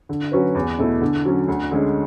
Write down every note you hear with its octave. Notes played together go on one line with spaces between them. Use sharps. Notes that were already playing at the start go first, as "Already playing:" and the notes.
D3
F#3 C#4 F#4 B4
E2
B2 A3 E4
D3
F#3 C#4
D2
D3 G#3 C#4